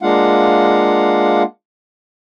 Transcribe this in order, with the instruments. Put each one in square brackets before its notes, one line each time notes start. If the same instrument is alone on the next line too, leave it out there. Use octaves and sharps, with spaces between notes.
[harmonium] G#3 A#3 D4 F4 F5 F#5